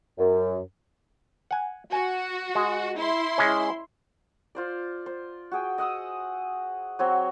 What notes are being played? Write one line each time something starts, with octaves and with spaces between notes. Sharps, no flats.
F#2
F#5 G#5
F#4 G#5
G#3
E4 C6
G#3 C#4
F4 C5 D5
C5
F#4 G#4 G5
D#5 F#5 D#6 E6
F#3 C4 C#5